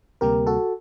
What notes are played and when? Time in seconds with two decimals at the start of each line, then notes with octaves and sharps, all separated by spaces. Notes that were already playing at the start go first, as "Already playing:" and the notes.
0.21 D2 C3 G3 A#3 G4 A#4
0.47 F#4 A4